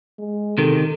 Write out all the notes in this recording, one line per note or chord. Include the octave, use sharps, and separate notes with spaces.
G#3
C3 D#3 A4